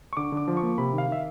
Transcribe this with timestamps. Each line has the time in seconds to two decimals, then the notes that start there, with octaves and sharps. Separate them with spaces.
0.13 C#6
0.17 D3 D6
0.32 D3
0.37 D6
0.48 F3
0.57 C#6
0.63 A#3
0.78 C3 B5
0.93 D#3
0.98 F5
1.08 D#3 E5